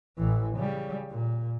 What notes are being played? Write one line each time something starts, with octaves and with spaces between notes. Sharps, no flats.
A1 E3
C#3 G3
A#2